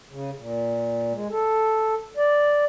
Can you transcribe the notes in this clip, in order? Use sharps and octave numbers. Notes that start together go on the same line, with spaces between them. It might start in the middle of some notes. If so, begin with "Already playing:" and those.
C#3
A#2
G#3
A4
D5